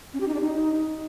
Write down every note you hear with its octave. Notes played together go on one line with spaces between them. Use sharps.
C#4
G4
D#4
D4
D#4